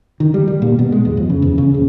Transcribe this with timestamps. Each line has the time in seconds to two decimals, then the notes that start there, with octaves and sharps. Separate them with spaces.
0.20 D#3
0.34 G3
0.48 G3
0.62 A#2
0.79 B2
0.92 G#3
1.05 E2
1.17 F2
1.30 C#3
1.42 E2
1.58 C#3
1.74 D#1